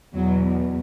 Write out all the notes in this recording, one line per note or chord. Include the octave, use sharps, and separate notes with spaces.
E2 B2 F#3